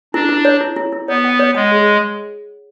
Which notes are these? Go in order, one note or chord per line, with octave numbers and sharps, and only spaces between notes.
D4 E4
E4
C#5
E4
E4
E4
B3 C#5
F#5
C#5
G#3 F#5
G#4